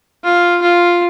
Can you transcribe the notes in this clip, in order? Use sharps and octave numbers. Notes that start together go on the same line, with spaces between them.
F4
F4